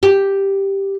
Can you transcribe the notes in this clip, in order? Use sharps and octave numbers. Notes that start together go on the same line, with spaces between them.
G4